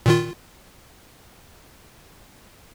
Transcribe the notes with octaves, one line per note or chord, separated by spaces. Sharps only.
A#2 D#3 F4